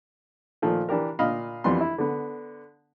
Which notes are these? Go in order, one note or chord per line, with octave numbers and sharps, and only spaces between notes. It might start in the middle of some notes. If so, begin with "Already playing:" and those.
A#2 D#3 F3 A3
E3 D4 G4 A#4
A#2 D#5 F5 B5
F2 E3 G3 B3 C6
E4
D3 B3